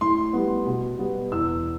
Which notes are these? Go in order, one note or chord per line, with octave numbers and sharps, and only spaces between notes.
A2 C6
G3 B3
B2
G3 B3
E2 E6